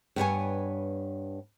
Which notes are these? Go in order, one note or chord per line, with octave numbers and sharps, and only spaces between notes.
G2 B3 C#5 G#5